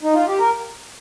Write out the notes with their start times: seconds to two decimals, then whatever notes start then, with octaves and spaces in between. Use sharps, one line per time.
0.02 D#4
0.14 F4
0.27 G4
0.38 A#4